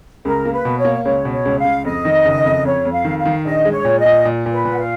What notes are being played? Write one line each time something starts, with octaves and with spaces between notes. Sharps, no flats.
C#2 A#4
A#3
B4
B2
C#5
A#3
C#2 C#5
B2
C#5
C#2
F5
C#2
F2 D#5
D#3
F#1
F2
F2 C#5
F2
F5
D#3
F5
D#3
A#1 D#5
G#3
C#5
A#2
D#5
A#2
A#2
A#2
B4
A#2
F#5
F5